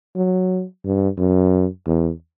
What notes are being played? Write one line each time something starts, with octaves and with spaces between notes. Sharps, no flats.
F#3
G2
F#2
E2